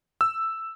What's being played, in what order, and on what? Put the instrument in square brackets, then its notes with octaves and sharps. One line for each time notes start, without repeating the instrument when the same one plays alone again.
[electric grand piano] E6